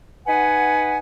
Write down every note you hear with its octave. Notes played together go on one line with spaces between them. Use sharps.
D#4 B4 F#5 G#5